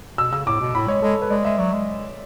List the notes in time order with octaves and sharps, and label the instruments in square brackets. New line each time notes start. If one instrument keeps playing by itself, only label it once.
[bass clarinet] B2 [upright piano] E6
[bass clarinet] C#3 [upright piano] E6
[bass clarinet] A2 [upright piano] D6
[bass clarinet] B2
[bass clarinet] A2 [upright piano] B5
[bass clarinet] G#3 [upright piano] C#5
[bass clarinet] G#3 [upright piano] A4
[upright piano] B4
[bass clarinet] G#3 [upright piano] D5
[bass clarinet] G#3 [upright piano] E5
[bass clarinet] F#3 [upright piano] D5
[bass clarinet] G#3